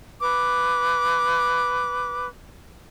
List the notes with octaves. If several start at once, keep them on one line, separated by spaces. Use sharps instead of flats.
B4 D6